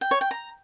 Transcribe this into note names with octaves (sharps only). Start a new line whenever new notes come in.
G5
C#5
G5
A#5